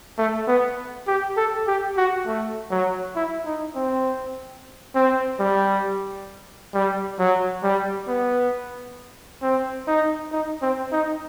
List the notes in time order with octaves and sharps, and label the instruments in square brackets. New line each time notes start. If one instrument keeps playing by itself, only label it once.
[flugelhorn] A3
B3
G4
A4
G4
F#4
A3
F#3
E4
D#4
C4
C4
G3
G3
F#3
G3
B3
C4
D#4
D#4
C4
D#4